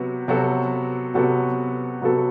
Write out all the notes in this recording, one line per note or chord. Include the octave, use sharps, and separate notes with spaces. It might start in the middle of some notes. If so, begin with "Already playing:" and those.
Already playing: C3 F#3 B3 F#4
C3 F#3 B3 F#4 A4
C3 F#3 B3 F#4 A4
C3 F#3 B3 F#4 A4